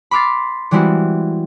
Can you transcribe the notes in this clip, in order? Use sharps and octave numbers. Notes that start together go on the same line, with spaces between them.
B5 C6 D6 F6 A6 C7
E3 G3 G#3 C4 E4 F#4